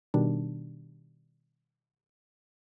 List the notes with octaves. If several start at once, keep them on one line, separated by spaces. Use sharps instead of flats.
B2 D#3 G3 D4